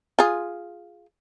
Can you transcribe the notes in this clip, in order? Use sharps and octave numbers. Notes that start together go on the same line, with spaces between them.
F4 G#4